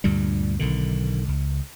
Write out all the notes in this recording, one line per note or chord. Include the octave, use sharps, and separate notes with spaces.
D2 G2 A#2 G3
B1 D3 D#3
C#2